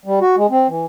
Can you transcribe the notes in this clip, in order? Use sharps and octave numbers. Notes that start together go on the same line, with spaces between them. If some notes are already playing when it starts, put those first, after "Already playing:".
G3
F#4
G#3
C4
E3